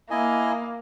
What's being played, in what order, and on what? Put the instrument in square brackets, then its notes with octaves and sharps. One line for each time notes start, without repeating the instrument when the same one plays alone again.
[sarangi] A#3 [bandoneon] E4 D#5 G#5